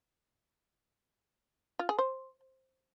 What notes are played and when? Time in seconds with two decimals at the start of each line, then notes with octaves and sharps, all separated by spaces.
1.79 F4
1.89 G#4
1.98 C5